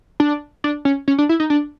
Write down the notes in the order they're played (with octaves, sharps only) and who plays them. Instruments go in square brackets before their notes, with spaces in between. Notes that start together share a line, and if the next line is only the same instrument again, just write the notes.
[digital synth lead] D4
D4
C#4
C#4
D4
E4
D#4
D4